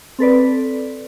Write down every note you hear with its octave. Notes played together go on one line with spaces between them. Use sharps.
C4 A4 B4 D5